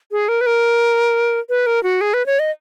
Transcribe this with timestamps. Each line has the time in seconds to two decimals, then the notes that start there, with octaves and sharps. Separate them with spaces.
0.12 G#4
0.29 A#4
0.41 B4
0.46 A#4
1.49 B4
1.66 A#4
1.83 F#4
2.01 G#4
2.14 B4
2.26 C#5
2.39 D#5